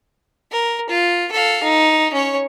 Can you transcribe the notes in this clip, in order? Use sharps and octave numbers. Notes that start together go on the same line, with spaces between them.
A#4
F4
A4 F5
D#4
C#4 C#5